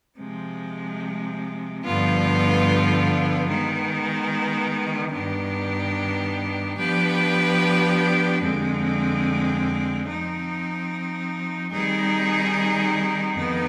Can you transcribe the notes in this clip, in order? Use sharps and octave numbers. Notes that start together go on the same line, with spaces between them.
C3 F3 G#3
G2 D3 F3 B3 F4
D#3 G#3 B3
G2 D#3 B3 D4 G4
F3 B3 D4 G4 B4
F2 D3 G#3 C4
F3 C4 D#4
D#3 G3 C4 D#4 G#4
F2 D#3 B3 D#4